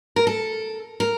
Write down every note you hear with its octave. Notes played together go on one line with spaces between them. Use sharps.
A#4
A4
A#4